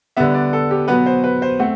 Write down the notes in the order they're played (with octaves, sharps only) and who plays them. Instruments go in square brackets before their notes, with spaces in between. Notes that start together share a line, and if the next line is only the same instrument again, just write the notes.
[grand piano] D3 G3 B3 E5
D5
A4
G4
B2 F#3 B3 B4
C5
B4
C5
A3 C4 F#5